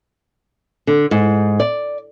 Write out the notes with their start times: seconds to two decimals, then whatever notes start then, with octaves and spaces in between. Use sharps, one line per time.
0.87 D3
1.11 G#2
1.60 D5